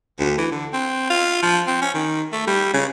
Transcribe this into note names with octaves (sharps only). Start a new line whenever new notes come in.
D2
E3
D3
C4
F4
F3
C4
C#4
D#3
A3
G3
C#3